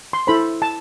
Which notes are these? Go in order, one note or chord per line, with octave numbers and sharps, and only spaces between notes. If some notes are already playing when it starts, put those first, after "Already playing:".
C6
E4 A4 C5 B5
A5